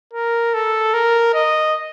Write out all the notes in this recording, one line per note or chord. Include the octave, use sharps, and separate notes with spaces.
A#4
A4
A#4
D#5